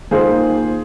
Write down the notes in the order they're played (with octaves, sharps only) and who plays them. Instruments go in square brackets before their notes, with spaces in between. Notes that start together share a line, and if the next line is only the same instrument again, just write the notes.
[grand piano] D#3 A#3 F4 C5 [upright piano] G#4